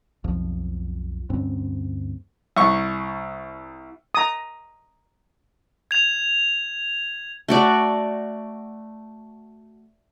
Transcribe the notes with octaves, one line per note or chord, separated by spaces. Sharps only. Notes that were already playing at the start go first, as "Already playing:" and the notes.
B1 F2 F3
D2 G2 C4 C#4
C2 C#6
A#5 D#6
G#6 F7
A3 F#4 D5